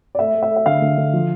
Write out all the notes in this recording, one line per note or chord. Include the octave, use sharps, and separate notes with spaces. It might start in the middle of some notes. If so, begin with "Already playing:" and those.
D5
A3 E5
A3
E5
A3
E5
D3 F5
D3
D3
F3